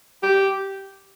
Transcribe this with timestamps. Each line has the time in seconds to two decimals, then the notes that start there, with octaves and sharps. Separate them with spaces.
0.23 G4